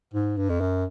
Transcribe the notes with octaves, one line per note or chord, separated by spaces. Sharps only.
G#2
G2
F2
F#2